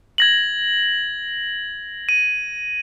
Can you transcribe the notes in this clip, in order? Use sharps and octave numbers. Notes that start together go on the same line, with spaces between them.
G#6 A#6 F#7
D#7